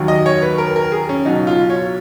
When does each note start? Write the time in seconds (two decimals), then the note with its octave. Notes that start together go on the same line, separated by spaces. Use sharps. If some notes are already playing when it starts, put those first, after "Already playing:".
Already playing: D#2 D#3 F#3
0.08 D#5
0.26 C#5
0.42 B4
0.58 A#4
0.76 A#4
0.92 G#4
1.09 C#4
1.25 C#2 B2 F#3 D#4
1.47 F4
1.70 C#5